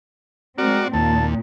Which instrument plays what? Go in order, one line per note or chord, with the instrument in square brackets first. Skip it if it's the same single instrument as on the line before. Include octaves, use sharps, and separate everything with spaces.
[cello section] G#3 C4 [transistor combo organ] F#4 D5 [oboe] A#4
[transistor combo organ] D#2 [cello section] A#2 [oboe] A5